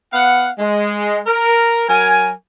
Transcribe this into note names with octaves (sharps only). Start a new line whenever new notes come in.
B3 F5 F#5
G#3
A#4
F#3 A#4 G#5